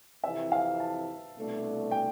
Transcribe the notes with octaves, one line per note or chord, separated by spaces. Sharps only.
F2 C3 E3 E5
F5
A5
C2 B2 A3 D4
G5